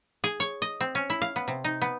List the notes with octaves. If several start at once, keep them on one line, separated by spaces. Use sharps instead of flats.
G#4
C#5
D#5
C4
C#4
E4
F5
B3
C3
D#4
B3